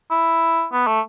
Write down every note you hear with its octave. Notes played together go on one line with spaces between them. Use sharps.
E4
B3
A3